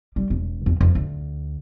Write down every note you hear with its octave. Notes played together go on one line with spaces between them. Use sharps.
G3
E1
E2
F2
D2